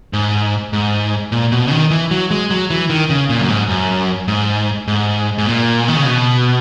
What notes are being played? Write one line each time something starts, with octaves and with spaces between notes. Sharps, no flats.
G#2
G#2
A#2
B2
C#3
D#3
E3
F#3
G#3
F#3
E3
D#3
C#3
A#2
F#2
G#2
F#2
G#2
G#2
G#2
A#2
D#3
C#3
B2